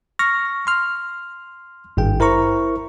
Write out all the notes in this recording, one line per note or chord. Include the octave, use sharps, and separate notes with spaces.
C#6 F6 A#6
C6 F6
G#1 G2 G#4 G5
E4 A#4 C5 A#5 C#6